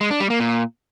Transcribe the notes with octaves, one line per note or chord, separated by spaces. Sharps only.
G#3
D4
G3
A#3
A#2